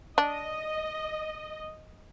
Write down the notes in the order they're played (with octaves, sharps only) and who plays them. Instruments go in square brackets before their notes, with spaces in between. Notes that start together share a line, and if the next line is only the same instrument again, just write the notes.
[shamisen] D4 [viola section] D#5